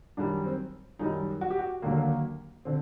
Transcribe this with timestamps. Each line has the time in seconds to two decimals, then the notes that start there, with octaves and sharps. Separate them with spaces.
0.17 F#2 D#3 G3 D4
0.45 C4
0.99 F#2 D#3 G3 D#4
1.41 F#4
1.50 G4
1.59 F#4
1.82 D#2 D3 F#3 A#3
1.97 A#3
2.65 D3 C4